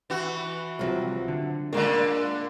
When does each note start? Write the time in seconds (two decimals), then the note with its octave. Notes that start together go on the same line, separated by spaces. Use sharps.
0.10 E3 F#4
0.79 C2 A2 C3 F3 F#3 E5
1.28 D3
1.73 A#2 D3 G#3 A#3 D4 A#4